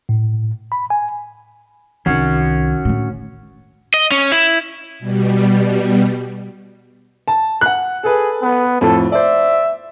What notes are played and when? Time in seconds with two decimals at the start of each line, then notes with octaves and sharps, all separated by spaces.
0.09 A2
0.72 B5
0.90 G#5
2.06 C2 D#3 C#4 F#4
2.85 A2 D3
3.94 D#5
4.11 C#4
4.32 E4
4.99 B2 G3
7.28 A5
7.61 F#5 F#6
8.04 G#4 A4 B4
8.42 B3
8.81 F2 A2 F3 A4
9.12 C5 D5 E5